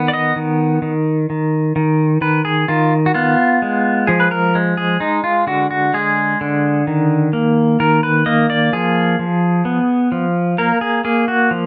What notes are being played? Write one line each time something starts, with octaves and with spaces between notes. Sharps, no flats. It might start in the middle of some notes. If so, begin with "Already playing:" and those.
Already playing: D#3 B3
D5
D#5
D#3
D#3
D#3
D#3
D#3 B4
G#4
D#3 F4
F#4
B3 F4
G#3
F3 G#4
B4
A#4
G#3
G#4
G#3 D#4
F4
D3 F#4
F#4
G#3 G#4
D3
D#3
A#3
D#3 A#4
B4
A#3 D#5
D5
F3 G#4
F3
B3
F3
A#3 A#4
G#4
A#3 G#4
F#4
F3